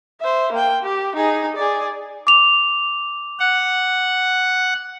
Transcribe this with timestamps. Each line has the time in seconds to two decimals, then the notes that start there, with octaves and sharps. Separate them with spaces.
0.21 C5 E5
0.52 A#3 G5
0.83 G4
1.16 D#4 G#4
1.56 G#4 D5
2.27 D6 F7
3.39 F#5